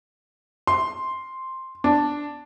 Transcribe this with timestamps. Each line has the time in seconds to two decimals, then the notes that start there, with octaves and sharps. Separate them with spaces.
0.67 C6
1.84 D4